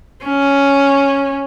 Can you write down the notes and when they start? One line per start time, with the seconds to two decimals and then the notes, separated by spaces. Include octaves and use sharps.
0.25 C#4